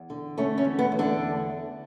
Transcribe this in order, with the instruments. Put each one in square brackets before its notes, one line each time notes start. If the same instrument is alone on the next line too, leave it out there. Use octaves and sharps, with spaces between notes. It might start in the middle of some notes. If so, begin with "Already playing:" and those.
Already playing: [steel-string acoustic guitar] E2
D3
A3 C#4
C#4
E2
B3
E2
D3 D4